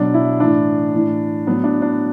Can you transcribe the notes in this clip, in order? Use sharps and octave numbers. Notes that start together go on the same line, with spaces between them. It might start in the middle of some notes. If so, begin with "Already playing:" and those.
Already playing: B2 F#3 D4
E4
A2 E3 D4
A2 E3
A2 F#3 B3
D4
D4